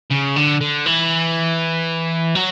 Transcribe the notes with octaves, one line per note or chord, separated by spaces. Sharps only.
C#3
D3
D3
E3
F#3